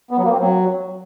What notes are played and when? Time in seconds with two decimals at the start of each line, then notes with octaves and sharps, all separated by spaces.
0.11 B3
0.18 F#3
0.25 A#3
0.32 C4
0.39 F#3